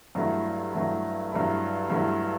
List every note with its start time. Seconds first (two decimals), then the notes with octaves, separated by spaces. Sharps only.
0.15 G2 F#3 A3 E4
0.73 G2 F#3 A3 E4
1.32 G2 F#3 A3 E4
1.90 G2 F#3 A3 E4